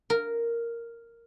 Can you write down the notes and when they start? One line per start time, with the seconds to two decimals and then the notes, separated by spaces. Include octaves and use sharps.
0.10 A#4